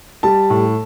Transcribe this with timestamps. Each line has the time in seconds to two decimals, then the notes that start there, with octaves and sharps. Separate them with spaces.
0.23 G3 A5
0.50 A2